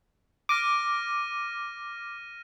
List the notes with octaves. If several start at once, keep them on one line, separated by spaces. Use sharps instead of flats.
D6 F6 A#6 D#7